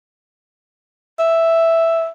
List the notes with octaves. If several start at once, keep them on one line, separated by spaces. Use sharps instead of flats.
E5